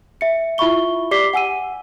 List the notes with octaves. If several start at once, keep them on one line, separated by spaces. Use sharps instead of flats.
E5 C#7
E4 F4 E5 B5 C#6 G7
G4 D5 D6 B6 C7 G7
F#5 G#5 E6 D#7